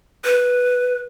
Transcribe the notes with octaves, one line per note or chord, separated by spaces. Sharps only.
B4